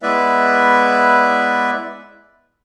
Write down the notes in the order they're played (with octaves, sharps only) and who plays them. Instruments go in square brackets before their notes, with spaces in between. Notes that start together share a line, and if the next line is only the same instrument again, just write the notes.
[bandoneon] G#3 B3 E4 B4 D5 E5